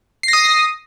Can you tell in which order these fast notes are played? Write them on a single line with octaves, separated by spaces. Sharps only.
C7 A#6 D#6